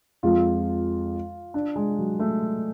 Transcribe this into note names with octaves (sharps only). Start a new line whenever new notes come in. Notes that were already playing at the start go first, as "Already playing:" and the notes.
F2 F3 G#3 F4
D4
G#3
F#3
A3